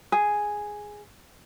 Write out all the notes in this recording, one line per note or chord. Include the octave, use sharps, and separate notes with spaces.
G#4